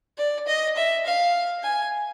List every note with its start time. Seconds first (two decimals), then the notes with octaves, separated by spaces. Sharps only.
0.18 D5
0.47 D#5
0.77 E5
1.06 F5
1.63 G#5